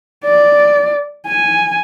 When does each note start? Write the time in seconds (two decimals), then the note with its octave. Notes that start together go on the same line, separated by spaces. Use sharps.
0.25 D5
1.27 G#5